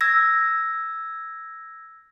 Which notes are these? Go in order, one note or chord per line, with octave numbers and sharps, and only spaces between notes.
E6 G#6 A#6